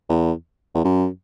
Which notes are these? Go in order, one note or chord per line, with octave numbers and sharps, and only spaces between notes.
E2
E2
F#2